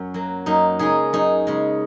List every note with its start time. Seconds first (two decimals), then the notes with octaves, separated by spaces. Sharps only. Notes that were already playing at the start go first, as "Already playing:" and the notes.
Already playing: F#2 C#4
0.14 F#3 A#3
0.46 F#2 A#3 D#4
0.79 C#3 G#3 D#4 G#4
1.13 F#2 D#4 G#4
1.47 C#3 G#3